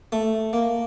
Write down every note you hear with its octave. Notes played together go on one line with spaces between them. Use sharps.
A3
A#3